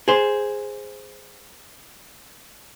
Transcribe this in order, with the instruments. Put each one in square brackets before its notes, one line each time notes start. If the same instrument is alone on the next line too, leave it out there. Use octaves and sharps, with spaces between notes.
[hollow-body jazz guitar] G#4 C5